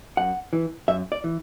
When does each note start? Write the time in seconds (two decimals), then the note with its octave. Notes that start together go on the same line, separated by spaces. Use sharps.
0.17 F#2 F#5
0.53 E3
0.88 F#2 E5
1.12 D5
1.24 E3